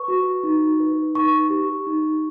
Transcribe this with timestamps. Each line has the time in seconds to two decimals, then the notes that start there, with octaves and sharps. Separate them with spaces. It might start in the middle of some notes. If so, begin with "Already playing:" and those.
Already playing: B4 C#6
0.08 F#4
0.43 D#4
0.80 B4
1.15 D#4 C#6
1.50 G4
1.86 D#4